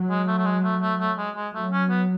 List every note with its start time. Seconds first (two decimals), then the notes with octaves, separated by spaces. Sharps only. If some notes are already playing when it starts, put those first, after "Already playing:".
Already playing: F#3
0.10 G#3
0.27 A3
0.39 A3
0.45 G#3
0.63 A3
0.82 A3
1.00 A3
1.18 G#3
1.36 G#3
1.54 F#3 A3
1.72 C#4
1.90 B3